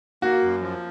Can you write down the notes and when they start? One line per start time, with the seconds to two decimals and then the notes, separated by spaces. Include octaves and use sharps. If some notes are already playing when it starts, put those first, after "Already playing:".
0.22 A#3 F#4
0.42 F#2
0.61 F3